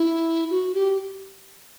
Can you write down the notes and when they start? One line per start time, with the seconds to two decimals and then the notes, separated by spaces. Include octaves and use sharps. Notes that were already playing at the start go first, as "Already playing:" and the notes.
Already playing: E4
0.50 F#4
0.74 G4